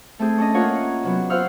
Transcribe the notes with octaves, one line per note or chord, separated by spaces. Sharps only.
A3 C4 G#4
C#4 D4 D#5
A#3 F4 A#4 C#5 F#5
C3 F#3 B3
F4 C5 F5 F#5 E6 F6